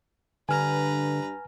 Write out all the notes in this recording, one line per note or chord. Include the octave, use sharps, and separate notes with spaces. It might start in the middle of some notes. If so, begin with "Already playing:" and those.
G2 D3 B4 G#5 A#5 F6